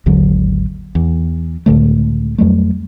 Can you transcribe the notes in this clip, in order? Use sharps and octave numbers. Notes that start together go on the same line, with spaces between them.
G#1 D#2 D3 F#3
E2
C#2 A2 D3 A3
F2 F#3 G3 A3